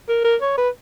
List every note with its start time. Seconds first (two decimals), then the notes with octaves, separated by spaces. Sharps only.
0.08 A#4
0.24 A#4
0.41 C#5
0.57 B4